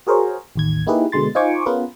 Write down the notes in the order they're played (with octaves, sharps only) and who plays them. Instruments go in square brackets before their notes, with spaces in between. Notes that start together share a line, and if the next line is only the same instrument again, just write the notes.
[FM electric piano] F#4 G#4 A#4 C5 C#5
A1 D#2 G#6
A#3 D#4 E4 G4 G#4 B4
B2 D3 G#3 C6 A6
D#4 F4 C5 G#5 C#6 D6
B3 C#4 F4 G#4 A#4 B4